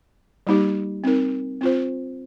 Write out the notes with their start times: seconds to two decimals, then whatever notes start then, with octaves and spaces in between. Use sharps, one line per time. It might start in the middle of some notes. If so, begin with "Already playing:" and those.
0.47 G3 A#3 D#4 G4
1.04 C4 D#4 A#4
1.61 C4 F4 C5